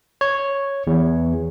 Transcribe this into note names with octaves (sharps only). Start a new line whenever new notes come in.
C#5
E2